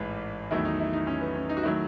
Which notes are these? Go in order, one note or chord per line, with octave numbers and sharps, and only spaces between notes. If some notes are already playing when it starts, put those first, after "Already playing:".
Already playing: A1 G#2 E3
E2 D#3 F#3 A3 E4
D#4
E4
D#4
C#4
B3
C#4
D#4
F#4
D#3 F#3 A3 E4